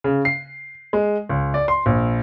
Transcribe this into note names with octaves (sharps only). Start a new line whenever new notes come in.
C#3
C7
G#3
C#2
D5
C6
A#1